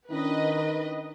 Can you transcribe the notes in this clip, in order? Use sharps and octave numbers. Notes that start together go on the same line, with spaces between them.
D#3 C#4 D4 E4 B4 D#5